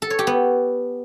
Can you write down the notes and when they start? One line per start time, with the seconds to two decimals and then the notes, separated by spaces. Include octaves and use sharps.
0.02 A4
0.10 C#5
0.19 G4
0.27 B3